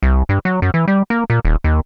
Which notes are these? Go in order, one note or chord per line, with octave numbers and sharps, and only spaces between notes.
C2
G2
F#3
F#2
E3
G3
A#3
A#2
D#1
D#2